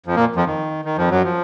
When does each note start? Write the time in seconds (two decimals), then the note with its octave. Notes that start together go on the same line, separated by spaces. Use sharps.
0.06 F2 F3
0.16 A#2 A#3
0.36 F2 F3
0.46 D#3
0.85 D#3
0.98 F2 F3
1.11 F#2 F#3
1.24 F3